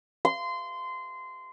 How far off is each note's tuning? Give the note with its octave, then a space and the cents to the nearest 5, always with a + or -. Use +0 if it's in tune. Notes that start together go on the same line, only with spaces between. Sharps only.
C6 -20